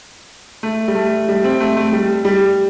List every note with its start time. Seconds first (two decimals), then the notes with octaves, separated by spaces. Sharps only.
0.63 A3
0.88 G3
0.95 A3
1.28 G3
1.44 C4
1.60 A3
1.77 A3
1.93 G3
2.25 G3